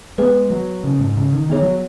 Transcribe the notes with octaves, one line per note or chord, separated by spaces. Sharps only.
G#3 B3 G#4 B4
F#3
C#3
G#2
C#3
D#3
D#3 B3 G#4 C#5
F#3